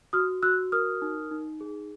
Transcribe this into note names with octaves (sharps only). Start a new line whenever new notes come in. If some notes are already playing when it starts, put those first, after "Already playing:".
F#4 D#6 F6
F#4 E6 F#6
A#4 D#6 F6
D#4
D#4
G#4